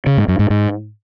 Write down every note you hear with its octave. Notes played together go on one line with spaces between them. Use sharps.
C#3
G#2
F#2
G#2
G#2